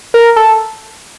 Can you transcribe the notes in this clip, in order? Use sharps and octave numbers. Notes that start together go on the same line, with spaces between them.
A#4
A4